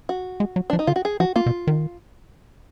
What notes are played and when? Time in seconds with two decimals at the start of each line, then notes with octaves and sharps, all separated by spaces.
0.09 F#4
0.40 G#3
0.56 F#3
0.70 F3 D4
0.79 D#4
0.87 D3 F4
0.96 F#4
1.05 G#4
1.20 F3 F#4
1.36 A#3 F4
1.46 B2
1.67 D#3